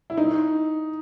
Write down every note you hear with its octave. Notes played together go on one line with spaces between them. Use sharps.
E4
D#4